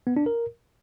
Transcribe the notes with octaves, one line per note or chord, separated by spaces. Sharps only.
B3
D4
A#4